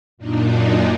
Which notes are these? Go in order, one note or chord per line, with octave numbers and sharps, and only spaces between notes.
F#2 A#2 D4 D#4